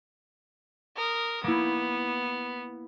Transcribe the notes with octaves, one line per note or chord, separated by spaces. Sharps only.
A#4 D#6
A#3 B3 E4